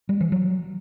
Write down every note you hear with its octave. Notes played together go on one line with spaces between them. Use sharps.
G3
E3
F#3